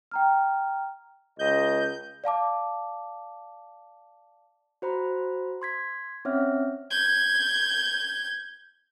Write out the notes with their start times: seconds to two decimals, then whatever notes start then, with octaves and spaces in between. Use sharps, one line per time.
0.11 G5 A#5 F6
1.39 C#2 D#5 G6
2.24 D5 F5 A5 D6
4.82 F#4 C5 A#5 B5
5.62 C6 G#6 B6
6.25 C4 C#4 C#5 E5 F6
6.90 G6 G#6